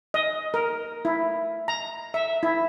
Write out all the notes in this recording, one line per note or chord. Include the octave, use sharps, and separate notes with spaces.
D#5
A#4
E4
A#5
E5
E4